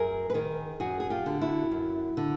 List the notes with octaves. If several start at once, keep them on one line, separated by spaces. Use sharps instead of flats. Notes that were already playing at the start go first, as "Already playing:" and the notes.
Already playing: F#2 G#4 A#4
B4
D#3 G#4 A#4
F#2 F#4 G#4
G#4
F4 G4
D3
E4 F#4
F#2
D3